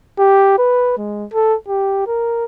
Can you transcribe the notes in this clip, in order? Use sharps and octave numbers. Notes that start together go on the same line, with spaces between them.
G4
B4
G#3
A4
G4
A#4